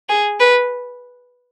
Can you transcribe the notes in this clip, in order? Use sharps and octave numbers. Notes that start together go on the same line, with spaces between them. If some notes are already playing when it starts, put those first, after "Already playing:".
G#4
B4